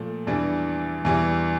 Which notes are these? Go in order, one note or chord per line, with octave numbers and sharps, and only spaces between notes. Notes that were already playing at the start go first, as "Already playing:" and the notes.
Already playing: A#2 F3 A3
E2 E3 G3 D4
E2 E3 G3